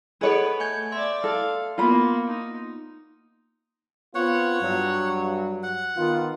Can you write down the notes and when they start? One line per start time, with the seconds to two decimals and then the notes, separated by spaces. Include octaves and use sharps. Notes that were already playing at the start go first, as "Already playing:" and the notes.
0.21 G#4 A4 B4 C#5 D#5 F#5 B5
0.60 A3 G#5 G6 G#6
0.92 D5 E5 C6
1.24 A4 F5
1.78 A#3 B3 F4 B5
2.27 D#4
4.15 B3 C4 F4 C#5 F#5
4.61 G2 F#3
5.63 F#5
5.96 D#3 B3 F4